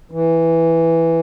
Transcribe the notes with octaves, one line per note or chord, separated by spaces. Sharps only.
E3